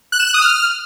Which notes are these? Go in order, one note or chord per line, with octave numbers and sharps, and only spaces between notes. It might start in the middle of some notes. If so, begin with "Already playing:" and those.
F#6
E7
F#6
D#6
F6